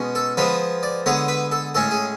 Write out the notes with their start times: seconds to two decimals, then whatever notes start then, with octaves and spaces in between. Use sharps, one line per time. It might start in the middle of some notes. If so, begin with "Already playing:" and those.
Already playing: B2 G#3 C#4
0.15 A4
0.37 F3 G#3 B3 B4
0.83 D5
1.06 D3 G#3 B3 C#5
1.28 B4
1.51 A4
1.75 A2 G#3 C#4 A4
1.91 G#4